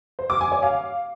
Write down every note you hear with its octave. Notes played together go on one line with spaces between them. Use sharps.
C5
D6
G#5
C#5
F5